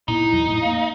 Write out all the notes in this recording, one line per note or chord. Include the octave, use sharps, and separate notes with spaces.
A#2 B3 D#4 E4
E2 F#3
A2
A3 A#3 F5